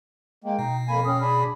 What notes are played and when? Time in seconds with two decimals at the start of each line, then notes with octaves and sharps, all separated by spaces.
0.44 G#3 A#3 G5
0.59 B2 D#4
0.88 F2 A#3 G#5 B5
1.06 C#4 G5 D#6 F6
1.20 D4 G#4 B5